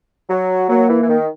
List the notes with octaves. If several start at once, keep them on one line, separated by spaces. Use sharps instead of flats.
F#3
F#3 A#3
E3
E3
D#3